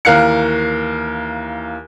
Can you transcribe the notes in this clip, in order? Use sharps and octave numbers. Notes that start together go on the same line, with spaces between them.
D#2 E3 A#4 F5 F#6 C#7